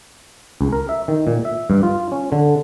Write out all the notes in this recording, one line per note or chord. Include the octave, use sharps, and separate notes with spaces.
C#2
A#4
E5
D#3
A#2
E5
G2
F4
C#4
D3